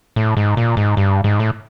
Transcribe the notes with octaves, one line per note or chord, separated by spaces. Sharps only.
A2
G#2
A#2
G#2
G2
G#2
A2